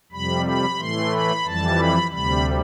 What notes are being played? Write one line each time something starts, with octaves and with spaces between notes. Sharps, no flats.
F2 C3 G3 B5
B5
A2 E3 A3 C6
B5
F2 E3 G3 A5
B5
D2 C3 G3 B5